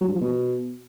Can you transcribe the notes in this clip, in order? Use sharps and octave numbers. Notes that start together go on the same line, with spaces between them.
F#3
G2
F3
B2